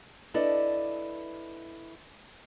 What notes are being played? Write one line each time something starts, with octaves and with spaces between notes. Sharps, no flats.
D4 E4 A4 B4 D5 D#5